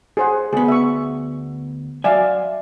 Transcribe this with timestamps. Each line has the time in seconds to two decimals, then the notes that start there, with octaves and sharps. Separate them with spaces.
0.17 G#4 C5 F#5
0.53 D2 B3 G#4
0.68 E5 C#6
2.04 F#3 D5 E5 F5 G#5